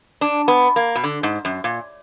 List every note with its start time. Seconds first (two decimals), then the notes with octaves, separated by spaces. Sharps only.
0.21 D4
0.48 B3
0.76 A#3
0.96 B2
1.04 D3
1.23 G#2
1.45 F#2
1.64 A#2